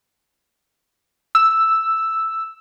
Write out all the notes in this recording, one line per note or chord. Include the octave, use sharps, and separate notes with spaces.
E6